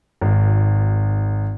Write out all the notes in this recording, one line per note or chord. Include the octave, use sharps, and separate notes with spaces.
G#1